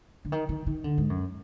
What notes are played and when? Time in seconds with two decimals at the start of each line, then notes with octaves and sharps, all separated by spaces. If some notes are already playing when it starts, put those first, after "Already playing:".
0.25 D3
0.32 D#3
0.49 D#3
0.67 D#3
0.84 D3
0.98 G#2
1.10 F#2